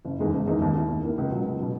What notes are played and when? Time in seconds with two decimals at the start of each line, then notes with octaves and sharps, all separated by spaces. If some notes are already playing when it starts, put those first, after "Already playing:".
0.05 F#1
0.19 E2 D#3 G#3 D#4
0.33 F#1
0.47 E2 D#3 G#3 D#4
0.62 D#2
0.75 D#3 A#3 E4
0.89 D#2
1.03 D#3 A#3 E4
1.18 C#2
1.31 B2 F#3
1.46 C#2
1.60 B2 F#3